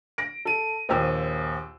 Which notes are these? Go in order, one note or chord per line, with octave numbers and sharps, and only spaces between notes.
A#6 D7
A4 D#7
A#1 D#2 C5 G5 E6